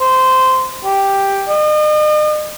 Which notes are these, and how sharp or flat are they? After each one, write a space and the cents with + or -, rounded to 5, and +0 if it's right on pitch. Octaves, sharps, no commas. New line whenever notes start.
C5 -15
G4 +5
D#5 -40